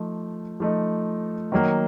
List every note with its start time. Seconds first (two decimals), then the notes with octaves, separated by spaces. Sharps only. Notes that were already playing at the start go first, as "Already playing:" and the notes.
Already playing: F3 A3 D#4
0.60 F3 A3 D#4
1.52 D#3 F#3 A#3